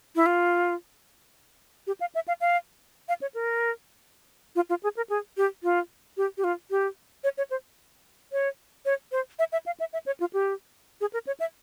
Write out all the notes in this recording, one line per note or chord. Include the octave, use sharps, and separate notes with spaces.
E4
F4
G4
F5
E5
F5
F5
F5
C#5
A#4
F4
F4
G#4
A#4
G#4
G4
F4
G4
G4
F4
G4
C#5
C#5
C5
C#5
C#5
C5
E5
E5
F5
E5
E5
C#5
F4
G4
G#4
A#4
C#5
E5